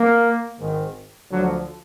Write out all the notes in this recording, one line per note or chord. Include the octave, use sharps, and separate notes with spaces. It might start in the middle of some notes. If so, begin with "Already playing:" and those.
Already playing: A#3
G#1 G#2 D#3
D2 D3 F3 F#3